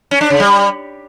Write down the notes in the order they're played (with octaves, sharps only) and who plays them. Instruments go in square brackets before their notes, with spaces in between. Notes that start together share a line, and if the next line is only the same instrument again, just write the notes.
[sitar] C#4
D4
C#3
G3